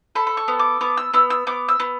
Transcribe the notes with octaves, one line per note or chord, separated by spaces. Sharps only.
A4 B5
B5
C#6
B3
D6
B3 D6
E6
B3 E6
E6
B3 D6
E6
B3